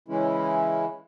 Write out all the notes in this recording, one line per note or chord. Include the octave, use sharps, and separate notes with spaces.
C#3 E3 G#3 C#4 E4